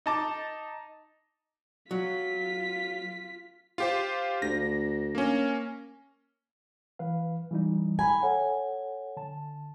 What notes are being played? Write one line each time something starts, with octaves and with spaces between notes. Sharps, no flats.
D#4 A5 D6
F#3 F4 B6
F4 G4 C5
D2 A#6
A#3 C#4
E3 B4 F5
E3 G3 D#4
G#5 A#5 B5
A4 C#5 F#5
D3 A5